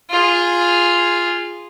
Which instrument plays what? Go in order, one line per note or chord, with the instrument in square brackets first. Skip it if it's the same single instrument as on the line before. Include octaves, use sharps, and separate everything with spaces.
[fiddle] F4 G#4